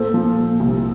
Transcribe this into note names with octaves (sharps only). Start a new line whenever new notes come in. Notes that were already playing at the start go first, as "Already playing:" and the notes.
Already playing: A#2 A4 C5
F3
A#2
C2